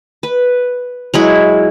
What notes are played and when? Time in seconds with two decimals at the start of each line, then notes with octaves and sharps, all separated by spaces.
0.23 B4
1.14 F#3 G#3 E4